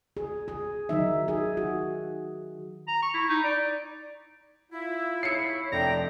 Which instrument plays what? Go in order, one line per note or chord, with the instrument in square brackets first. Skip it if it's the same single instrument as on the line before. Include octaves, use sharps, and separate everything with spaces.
[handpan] G#4
G#4
D#3 F#3 D#4 E5
G#4
F#4
[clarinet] A#5
C#6
E4
D#4
D5
[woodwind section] E4 [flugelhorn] F4
[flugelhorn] C#5 [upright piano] C7 C#7
[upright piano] F1 [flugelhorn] D4 [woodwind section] D5 E5 G5 [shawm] A#5